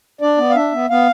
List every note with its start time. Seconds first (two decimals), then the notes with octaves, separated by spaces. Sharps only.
0.21 D4 D5
0.38 B3
0.50 F5
0.55 D4 E5
0.72 B3
0.90 B3 F5